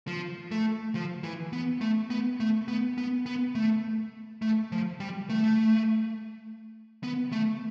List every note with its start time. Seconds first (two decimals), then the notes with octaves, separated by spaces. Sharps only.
0.07 F3
0.51 A3
0.95 F3
1.24 E3
1.53 B3
1.81 A3
2.10 B3
2.40 A3
2.68 B3
2.98 B3
3.26 B3
3.55 A3
4.42 A3
4.72 F3
5.00 G3
5.30 A3
7.03 B3
7.32 A3